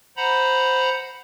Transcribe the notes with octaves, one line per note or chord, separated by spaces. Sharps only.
C5 F#5 A#5 B5